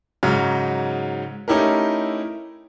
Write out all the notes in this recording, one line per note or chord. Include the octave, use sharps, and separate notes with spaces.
G#2 C#3 F#3 D#4
A3 C#4 D#4 E4 G4 A#4